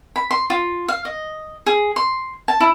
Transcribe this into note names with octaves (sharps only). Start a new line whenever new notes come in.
B5
C6
F4
F5
D#5
G#4
C6
A5
E4